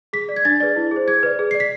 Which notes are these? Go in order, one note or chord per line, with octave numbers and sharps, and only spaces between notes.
G#4 B6
D5
G#6
D4 A6
G#4 B4 D5
E4
G#4 C5
G#4 G#6
B4 D5
G#4
D5 C7
B6